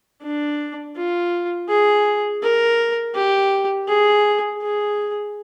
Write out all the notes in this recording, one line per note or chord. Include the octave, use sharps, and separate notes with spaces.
D4
F4
G#4
A#4
G4
G#4
G#4